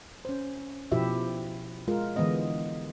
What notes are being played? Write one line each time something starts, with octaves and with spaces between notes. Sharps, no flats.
C#4 C5
B2 F3 E4 G4 E5
G#3 F4 A#4
D3 E3 G#3 B3 D#5